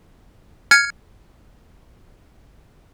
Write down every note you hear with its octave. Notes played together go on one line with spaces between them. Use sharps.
F6 G#6 C#7